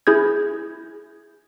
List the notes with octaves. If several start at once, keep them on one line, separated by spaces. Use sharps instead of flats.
E4 G#4 G6 G#6